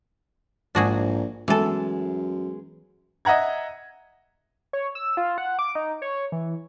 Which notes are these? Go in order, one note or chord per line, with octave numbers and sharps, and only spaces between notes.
A#1 G#2 D4 F#4 G#4
F#2 E3 G#3 A3 B3 A4
D#5 E5 F#5 A#5 G#6
C#5
E6
F4
F#5
D6
D#4
C#5
E3